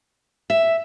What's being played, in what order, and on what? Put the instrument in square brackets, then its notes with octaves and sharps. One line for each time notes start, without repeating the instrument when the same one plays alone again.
[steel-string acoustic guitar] E5